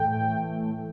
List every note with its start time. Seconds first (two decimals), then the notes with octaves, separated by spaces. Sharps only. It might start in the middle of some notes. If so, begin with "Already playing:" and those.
Already playing: A2 E3 A3 G5